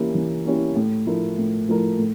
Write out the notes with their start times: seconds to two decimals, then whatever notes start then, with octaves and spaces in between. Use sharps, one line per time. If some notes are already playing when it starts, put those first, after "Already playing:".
Already playing: E3 A#3 C#4 E4 G4
0.15 E3
0.45 A#3 C#4 E4 G4
0.76 A2
1.06 F3 A3 E4 A#4
1.38 A2
1.69 F3 A3 E4 A#4
1.99 A2